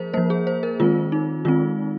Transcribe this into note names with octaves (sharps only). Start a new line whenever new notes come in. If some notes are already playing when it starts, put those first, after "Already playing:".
Already playing: F3 A#3 G#4 A#4 C5
F3 A#3 C5
G#4
C5
A#4
D#3 G#3 C4 F4
D#4
D#3 G#3 C4 F4